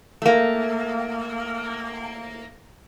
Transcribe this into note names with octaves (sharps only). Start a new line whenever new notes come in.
A3 A#3